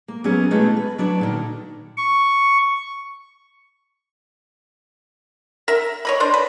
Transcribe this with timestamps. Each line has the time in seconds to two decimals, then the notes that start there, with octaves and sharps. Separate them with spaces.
0.08 A#3
0.24 F#3 B3 C#4 G#4 A#4
0.51 B2 E3 G#3 A3 B3
0.77 B4
0.98 F#3 D4 B4 D5
1.19 A#2 D3 D#3
1.97 C#6
5.68 A#4 E5
6.05 C#5 D#5 B5
6.20 D4 C5
6.34 B4